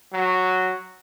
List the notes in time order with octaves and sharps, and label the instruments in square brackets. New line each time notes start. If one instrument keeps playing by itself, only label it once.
[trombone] F#3